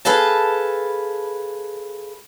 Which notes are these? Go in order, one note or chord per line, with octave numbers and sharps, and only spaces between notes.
G#4 A4 B4 F5 A5